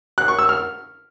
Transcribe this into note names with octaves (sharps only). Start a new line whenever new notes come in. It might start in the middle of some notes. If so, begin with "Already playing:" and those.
F#6
C#6
E6
F6